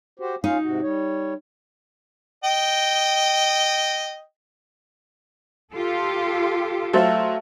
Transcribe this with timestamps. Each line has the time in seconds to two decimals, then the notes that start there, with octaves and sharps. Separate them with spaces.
0.19 F#4 G4 C5
0.44 C#4 D#4 F4 F5
0.62 G#2 C3 F#4
0.82 G3 C#5
2.44 D#5 G5
5.75 F4 G4 A4
6.93 F#3 A3 A4 C5 E5 F5